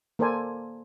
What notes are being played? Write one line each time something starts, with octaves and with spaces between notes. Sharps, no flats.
A#3 A4 A#4 C5 D5 G#5